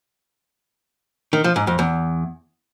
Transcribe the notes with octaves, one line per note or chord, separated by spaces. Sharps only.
D#3
F3
G#2
F2
E2